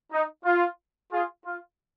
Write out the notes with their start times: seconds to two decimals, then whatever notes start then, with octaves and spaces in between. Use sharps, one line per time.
0.12 D#4
0.44 F4
1.11 F4 G#4
1.45 F4